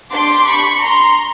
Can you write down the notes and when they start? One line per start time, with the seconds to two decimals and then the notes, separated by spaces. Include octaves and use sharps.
0.13 D4 G4 C6 D6
0.48 B5 C#6
0.83 A#5 C6